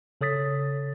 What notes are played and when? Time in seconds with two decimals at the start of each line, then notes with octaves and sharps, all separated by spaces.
0.21 C#3 A4 C#5 D#6 A6 B6